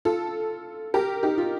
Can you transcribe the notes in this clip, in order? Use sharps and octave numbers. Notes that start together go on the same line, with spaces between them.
F4 A4
G4 A#4
D#4 G4
F4